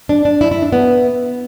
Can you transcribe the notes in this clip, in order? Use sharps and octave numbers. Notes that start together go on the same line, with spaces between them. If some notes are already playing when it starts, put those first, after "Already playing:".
D4
D4
E4
E4
D4
B3